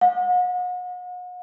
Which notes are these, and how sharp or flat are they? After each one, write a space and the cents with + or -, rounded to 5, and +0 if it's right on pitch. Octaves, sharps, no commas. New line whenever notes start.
F#5 -40